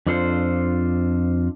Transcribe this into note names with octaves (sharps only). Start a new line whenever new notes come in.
F2 D4 F4 A4 C5